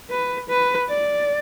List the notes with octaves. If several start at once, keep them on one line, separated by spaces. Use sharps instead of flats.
B4
B4
D5